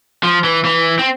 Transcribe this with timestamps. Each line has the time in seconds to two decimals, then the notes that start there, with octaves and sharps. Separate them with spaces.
0.23 F3
0.44 E3
0.65 E3
0.99 C4